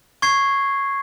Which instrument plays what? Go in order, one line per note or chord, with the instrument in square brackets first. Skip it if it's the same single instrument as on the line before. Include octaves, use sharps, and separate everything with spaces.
[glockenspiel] C#6 G#6 C7